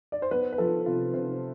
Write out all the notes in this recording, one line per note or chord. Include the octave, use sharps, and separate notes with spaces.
D5
C5
B3 B4
B4
F3 A4
C3 F4
C3 C5